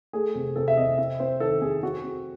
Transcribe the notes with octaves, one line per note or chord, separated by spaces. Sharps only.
A3 G#4
C3
C3 A4
E5
C3 D#5
C4 E5
C4 C5
D#3 A4
C4 G#4
C4 F#4
C4